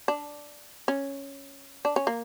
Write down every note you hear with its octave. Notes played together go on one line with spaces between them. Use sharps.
D4
C#4
D4
C#4
A#3